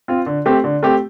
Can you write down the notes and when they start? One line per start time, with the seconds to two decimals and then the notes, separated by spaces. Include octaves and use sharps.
0.08 C4 F4
0.26 D3
0.46 A3 C4 G4
0.64 D3
0.83 A3 C4 G4